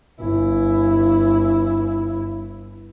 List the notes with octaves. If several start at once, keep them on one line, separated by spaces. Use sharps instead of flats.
G1 E4